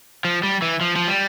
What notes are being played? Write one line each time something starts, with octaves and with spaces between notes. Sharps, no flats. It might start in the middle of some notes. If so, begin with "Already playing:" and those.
F3
G3
E3
F3
F3
G3